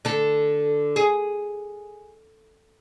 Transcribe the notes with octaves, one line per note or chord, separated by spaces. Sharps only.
D3 A4
G#4